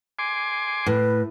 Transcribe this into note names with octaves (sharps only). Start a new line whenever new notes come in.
G#5 C6 D6
A2 B4